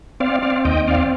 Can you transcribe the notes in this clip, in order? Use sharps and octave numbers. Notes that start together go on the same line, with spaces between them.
C4 D5 F5
C4 D5 F5
D#2 D#5 G5
C4 D5 F5